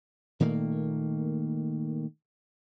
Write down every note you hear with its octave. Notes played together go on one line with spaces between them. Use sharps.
A#2 D#3 A3 A#3